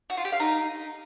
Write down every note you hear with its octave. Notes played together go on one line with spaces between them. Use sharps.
F#4
F4
G4
F5
D#4